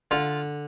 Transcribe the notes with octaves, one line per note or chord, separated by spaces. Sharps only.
D3 F4